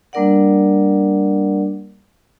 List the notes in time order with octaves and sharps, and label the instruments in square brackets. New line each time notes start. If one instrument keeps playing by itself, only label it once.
[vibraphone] G3 A#3 D4 A#4 D5 F#5